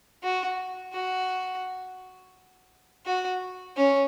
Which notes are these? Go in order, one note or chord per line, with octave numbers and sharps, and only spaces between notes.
F#4
F#4
F#4
C#4